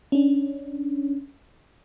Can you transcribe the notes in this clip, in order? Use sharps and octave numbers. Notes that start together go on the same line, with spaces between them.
C#4 D4